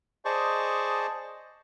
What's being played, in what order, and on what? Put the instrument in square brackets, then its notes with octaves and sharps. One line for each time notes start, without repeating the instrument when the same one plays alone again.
[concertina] G#4 C5 D5 D#5 A5 C#6